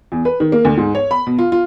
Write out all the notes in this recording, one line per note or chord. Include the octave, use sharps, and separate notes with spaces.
E2
B4
D#3
A#3
D2
G#2
C#5
B5
B2
F4
F4